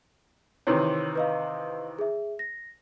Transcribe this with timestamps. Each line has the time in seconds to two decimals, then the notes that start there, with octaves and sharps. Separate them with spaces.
0.67 C3 D#3 E3 C#5
1.15 B4 D#5 F5
1.99 G#4 E5
2.39 A#6